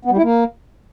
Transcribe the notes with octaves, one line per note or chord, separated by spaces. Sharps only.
B3
G3
E4
A#3